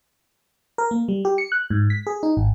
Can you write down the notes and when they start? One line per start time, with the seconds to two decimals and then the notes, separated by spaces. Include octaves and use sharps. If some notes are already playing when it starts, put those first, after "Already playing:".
0.78 A#4
0.91 A#3
1.08 G3
1.25 G4
1.38 C#7
1.52 F#6
1.70 G#2
1.90 B6
2.07 G#4
2.23 D#4
2.37 G#1